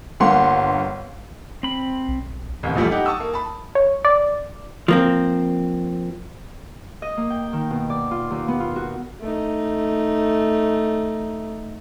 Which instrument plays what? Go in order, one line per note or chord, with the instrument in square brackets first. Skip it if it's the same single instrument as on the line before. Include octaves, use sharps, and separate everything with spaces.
[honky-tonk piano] G1 G2 A#3 F#5 C6
[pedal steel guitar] C4 B5
[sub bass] B1
[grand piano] A1 D#2 C3
A#1 E2 F3 G3 A3
D#4 G4 F#5
A5 C#6 D#6 E6
A#3
A5 B5
[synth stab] C#5
D5
[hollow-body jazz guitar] F3 A#3 C4
[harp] D#5
A#3
G5
D#3
B2
D5
F4
D#2
B3
F4
F#4
[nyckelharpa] A3 D#4